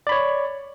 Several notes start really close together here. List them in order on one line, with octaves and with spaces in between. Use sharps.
D5 B5 C#5